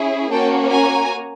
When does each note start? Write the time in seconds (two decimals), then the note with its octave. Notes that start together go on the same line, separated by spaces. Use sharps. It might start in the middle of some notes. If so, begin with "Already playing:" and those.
Already playing: C#4 E4 G#4
0.31 A#3 C#4 F#4 G5 A5
0.71 G#5 A#5